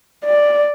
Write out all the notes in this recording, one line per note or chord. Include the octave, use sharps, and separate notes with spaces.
D5